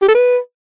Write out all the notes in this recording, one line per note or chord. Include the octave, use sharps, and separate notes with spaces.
G4
A4
B4